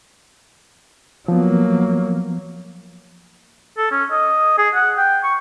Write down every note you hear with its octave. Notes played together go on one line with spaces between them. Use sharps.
F3 F#3 A#3 B3
A4
C#4
D#5
G#4
F#5
G5
C#6